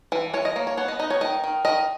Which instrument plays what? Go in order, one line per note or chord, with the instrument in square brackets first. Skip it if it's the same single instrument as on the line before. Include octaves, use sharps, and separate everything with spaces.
[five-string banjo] E3
E3 C#5
D#5
A#3 C#5
C#5
B3 C#5
D#5
D#4 D#5
C#5
D#3 D#5
D#3
D#3 D#5